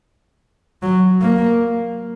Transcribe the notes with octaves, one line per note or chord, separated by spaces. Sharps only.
F#3
A#3